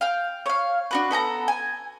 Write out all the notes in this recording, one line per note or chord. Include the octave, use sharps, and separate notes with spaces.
F5 G5
C#5 F5
D4 F#4 B4
B3 A4 G#5 A#5
G#5